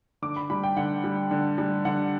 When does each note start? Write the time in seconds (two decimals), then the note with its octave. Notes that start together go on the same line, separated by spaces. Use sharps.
0.22 D3 D6
0.36 B5
0.50 G3 B5
0.64 G5
0.77 D3 F#5
1.04 G3
1.31 D3
1.58 G3
1.85 D3 F#5